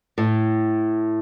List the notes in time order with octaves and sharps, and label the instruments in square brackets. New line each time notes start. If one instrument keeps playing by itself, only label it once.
[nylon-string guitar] A2